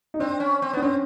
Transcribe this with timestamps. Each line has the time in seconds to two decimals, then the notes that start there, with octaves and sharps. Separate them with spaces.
0.14 D#4
0.20 C4 D4
0.40 C#4
0.62 C4
0.73 B3 D4
0.82 C4 C#4